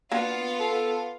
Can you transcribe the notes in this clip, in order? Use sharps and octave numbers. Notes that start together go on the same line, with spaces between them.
A#3 B3 D4 F4 F#4 F5
A4